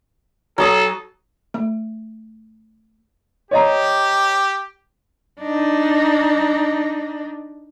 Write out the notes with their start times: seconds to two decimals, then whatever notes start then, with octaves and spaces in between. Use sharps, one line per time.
0.58 F#3 A4 D#6
1.54 A3
3.51 G4 C#5 D#5 A#5
5.41 D4 D#4